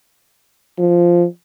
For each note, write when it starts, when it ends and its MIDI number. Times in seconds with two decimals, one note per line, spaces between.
0.79 1.25 53